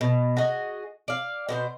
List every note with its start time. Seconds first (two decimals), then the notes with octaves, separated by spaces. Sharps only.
0.01 B2
0.37 F#4 G#4 D#5
1.08 D5 F5
1.49 B2 F#4 C5